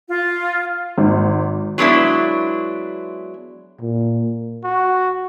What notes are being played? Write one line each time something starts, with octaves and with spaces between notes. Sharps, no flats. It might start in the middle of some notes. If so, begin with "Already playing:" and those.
F4
G#1
F#3 G#3 B3 D4 E4
A#2
F#4